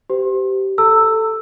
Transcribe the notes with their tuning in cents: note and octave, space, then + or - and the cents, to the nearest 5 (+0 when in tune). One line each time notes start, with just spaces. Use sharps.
G4 -15 C5 -35
A4 +5 A#5 -45 E6 +0